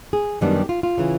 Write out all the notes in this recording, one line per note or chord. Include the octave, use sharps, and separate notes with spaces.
G#4
F#2 D#3 G3 B3 D4
G4
F4
F4
C#3 E3